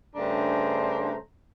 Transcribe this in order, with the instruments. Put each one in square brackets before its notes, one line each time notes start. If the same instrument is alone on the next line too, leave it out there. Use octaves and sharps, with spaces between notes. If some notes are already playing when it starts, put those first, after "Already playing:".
[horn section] G2 C#3 A3 D4 C5 A#5